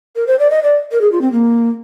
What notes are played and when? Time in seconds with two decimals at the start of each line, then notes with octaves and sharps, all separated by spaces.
0.16 A#4
0.27 C5
0.39 D5
0.50 D#5
0.63 D5
0.91 A#4
1.01 G#4
1.11 F4
1.21 C4
1.32 A#3